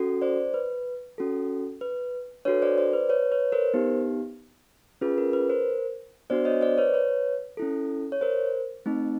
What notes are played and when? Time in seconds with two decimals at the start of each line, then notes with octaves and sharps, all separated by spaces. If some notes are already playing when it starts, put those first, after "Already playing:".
Already playing: C#4 F#4 A4
0.22 C5 D5
0.54 B4
1.18 C#4 F#4 A4
1.81 B4
2.45 D4 F#4 A4 B4 C#5
2.62 C5 D5
2.78 C5 D5
2.93 B4
3.09 B4 C#5
3.31 B4 C#5
3.52 A#4 C5
3.74 B3 D#4 G4
5.01 C#4 F4 G#4 B4
5.18 A#4
5.33 B4
5.50 A#4 C5
6.30 B3 D4 F#4 C5 D5
6.45 C#5 D#5
6.61 C5 D5
6.78 B4 C#5
6.94 B4 C#5
7.57 C#4 E4 A4
8.12 C#5
8.21 A#4 C5
8.86 A3 C4 D#4